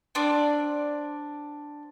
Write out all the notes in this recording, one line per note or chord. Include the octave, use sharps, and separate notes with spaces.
C4 D4 D5